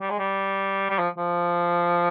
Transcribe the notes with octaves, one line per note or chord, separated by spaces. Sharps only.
G3
G#3
G3
G3
F3
F3